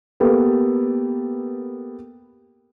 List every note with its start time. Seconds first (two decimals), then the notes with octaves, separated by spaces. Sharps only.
0.20 A#3 B3 G4 A4 B4